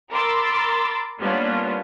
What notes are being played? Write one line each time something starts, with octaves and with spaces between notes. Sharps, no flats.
A#4 B5 C6 D6 E6 A6
G3 A#3 B3 C#4 D4 F4